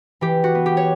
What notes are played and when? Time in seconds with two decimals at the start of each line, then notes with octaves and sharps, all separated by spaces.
0.21 E3 G4
0.44 F#4
0.55 B3
0.66 G4
0.77 C#5